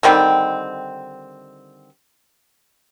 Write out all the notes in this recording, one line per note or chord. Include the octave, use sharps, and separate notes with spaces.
D3 D#3 G3 C4